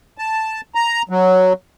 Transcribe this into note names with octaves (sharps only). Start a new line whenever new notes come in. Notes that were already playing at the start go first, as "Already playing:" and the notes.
A5
A#5
F#3